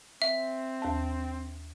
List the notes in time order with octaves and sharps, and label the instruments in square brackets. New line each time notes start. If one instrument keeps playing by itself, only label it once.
[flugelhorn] C4 [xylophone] E5
[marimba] D#2 A5